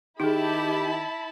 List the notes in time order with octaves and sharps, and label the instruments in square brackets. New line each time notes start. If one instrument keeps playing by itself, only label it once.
[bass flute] D#3 [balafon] D#4 G#4 [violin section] E4 A5 B5 [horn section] G4